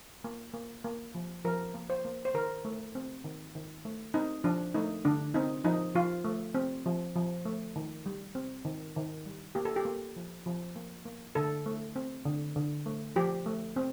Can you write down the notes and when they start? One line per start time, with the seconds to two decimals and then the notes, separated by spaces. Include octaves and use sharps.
0.24 A#3
0.54 A#3
0.84 A#3
1.15 F3
1.45 F3 A#4
1.74 A#3
1.90 C5
2.05 A#3
2.25 C5
2.34 D#3 A#4
2.65 A3
2.95 C4
3.24 D#3
3.55 D#3
3.85 A3
4.14 C4 D#4
4.44 F3 D4
4.74 A3 D#4
5.05 D3 D4
5.34 C4 D#4
5.64 F3 D#4
5.95 F3 F4
6.24 A3
6.55 C4
6.86 F3
7.16 F3
7.45 A3
7.76 D#3
8.06 G3
8.35 C4
8.65 D#3
8.96 D#3
9.26 G3
9.55 A#3 G4
9.65 A4
9.76 G4
9.85 A#3
10.16 F3
10.46 F3
10.76 A#3
11.05 A#3
11.35 D3 A4
11.66 A3
11.96 C4
12.25 D3
12.56 D3
12.86 A3
13.16 F3 G4
13.46 A3
13.76 C4